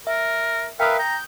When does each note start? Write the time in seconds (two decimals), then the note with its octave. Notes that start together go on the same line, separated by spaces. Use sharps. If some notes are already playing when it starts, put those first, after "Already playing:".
0.07 A#4 E5
0.80 A#4 B4 E5 F5 G5 D#6
0.99 A#5 G6